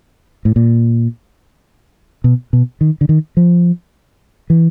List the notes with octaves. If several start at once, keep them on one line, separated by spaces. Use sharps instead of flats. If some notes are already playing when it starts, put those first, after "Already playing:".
A2
A#2
B2
B2
D#3
D3
D#3
F3
E3